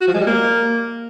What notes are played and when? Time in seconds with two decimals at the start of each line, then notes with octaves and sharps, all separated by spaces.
0.01 F#4
0.08 F3
0.14 G#3
0.20 G3
0.27 A#3